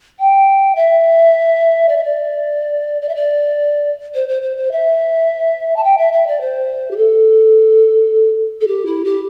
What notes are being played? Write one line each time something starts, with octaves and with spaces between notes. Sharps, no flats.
G5
E5
D5
E5
D5
D5
E5
D5
C5
C5
C5
C5
E5
A5
G5
E5
E5
D5
C5
G4
A4
A4
G4
E4
G4